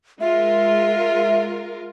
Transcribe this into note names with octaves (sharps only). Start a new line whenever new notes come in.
G#3 F4 A#4 E5